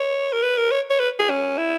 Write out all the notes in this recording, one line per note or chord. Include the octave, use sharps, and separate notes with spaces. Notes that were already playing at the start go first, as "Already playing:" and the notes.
Already playing: C#5
A#4
B4
A#4
C#5
C#5
B4
G#4
C#4
E4